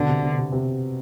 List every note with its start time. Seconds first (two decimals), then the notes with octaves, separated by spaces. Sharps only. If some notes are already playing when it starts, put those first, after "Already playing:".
Already playing: B2 D3 B3
0.09 C3
0.23 C3
0.38 C3
0.52 C3